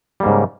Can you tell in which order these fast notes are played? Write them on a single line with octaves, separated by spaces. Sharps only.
G3 A#3 G#2 C#3